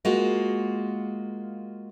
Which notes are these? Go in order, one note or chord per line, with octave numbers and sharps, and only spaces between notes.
G#3 A#3 F4 F#4